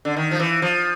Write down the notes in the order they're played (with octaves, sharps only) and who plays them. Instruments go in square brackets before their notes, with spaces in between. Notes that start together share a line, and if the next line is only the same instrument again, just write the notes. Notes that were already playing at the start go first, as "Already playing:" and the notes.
[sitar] D3
D#3
F3
E3
F3